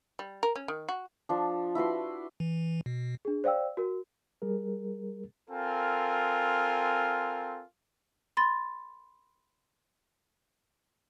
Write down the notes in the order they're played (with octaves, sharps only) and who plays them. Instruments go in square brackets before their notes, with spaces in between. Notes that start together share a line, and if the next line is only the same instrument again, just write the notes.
[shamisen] G3
A#4
C#4
D#3
F#4
[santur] F3 D4
E4 F#4 B4 C6
[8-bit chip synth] E3
B2
[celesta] D4 G#4
C5 D5 F5 G5 E6
F#4 A#4
[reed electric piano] G3 G#4 A#4
[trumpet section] C4 F4 A4 A#4 G#5
[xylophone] B5 C6 A6